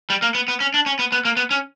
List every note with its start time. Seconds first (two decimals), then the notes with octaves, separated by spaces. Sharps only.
0.10 G3
0.22 A#3
0.35 B3
0.48 B3
0.60 C#4
0.74 D4
0.86 C#4
0.99 B3
1.12 B3
1.25 A#3
1.37 B3
1.51 C#4